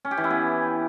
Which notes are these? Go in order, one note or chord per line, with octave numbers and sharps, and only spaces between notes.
C#4
G4
E3
E4
B3